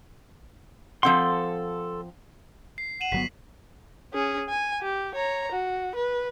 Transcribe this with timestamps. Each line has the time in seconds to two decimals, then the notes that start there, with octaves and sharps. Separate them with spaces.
1.03 F3 C4 A4 F#5 C6
2.78 C7
3.01 F#5 D#7 E7 F#7
3.12 G1 F#3 B3 B6
4.13 C#4 G#4
4.49 G#5
4.82 G4
5.15 C#5 A#5
5.52 F#4
5.95 B4